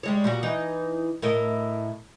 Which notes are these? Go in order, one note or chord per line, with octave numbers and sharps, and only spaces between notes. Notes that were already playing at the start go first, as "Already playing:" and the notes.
G3 G#3 C#5
A#2 G3 F#4
E3 D#4
A2 A#4 D#5